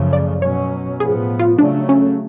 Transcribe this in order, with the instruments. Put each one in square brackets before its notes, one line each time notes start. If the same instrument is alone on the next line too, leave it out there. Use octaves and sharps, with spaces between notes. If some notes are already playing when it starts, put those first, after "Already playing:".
Already playing: [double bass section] F#2 C#3 F3 A3
[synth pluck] D5
[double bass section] B2 F#3 C#4 [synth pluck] C#5
[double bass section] A2 F3 B3 [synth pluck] G#4
[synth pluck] F4
[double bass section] C#3 F#3 A3 [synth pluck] D4
[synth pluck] C#4